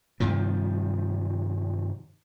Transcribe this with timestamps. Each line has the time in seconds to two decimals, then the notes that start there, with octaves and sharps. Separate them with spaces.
0.20 G2 C3 D#3 F3